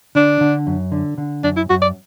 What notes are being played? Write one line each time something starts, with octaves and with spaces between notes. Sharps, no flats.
D3 D4
D3
F#2
D3
D3
F#2 D4
E4
F#2 F#4
D5